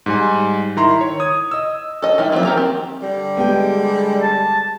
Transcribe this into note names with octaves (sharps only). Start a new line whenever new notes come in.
G#2 G3 G#5
D#3 E4 A#5 C6
C#5
D#6 G#6
D#5 E6
A4 D#5
D#3 G3 E4
F3 F#3 A#3 C4 E4
D#3 G4 A#4 A#5
C4
D3 G3
G#3 B3 G4 G5
A5